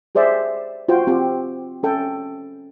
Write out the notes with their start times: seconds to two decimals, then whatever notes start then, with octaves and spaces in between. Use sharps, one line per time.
0.15 G4 G#4 C5 D5 E5
0.89 F4 F#4 C5 G5
1.07 C4 F4 G4
1.83 C#4 A4 G5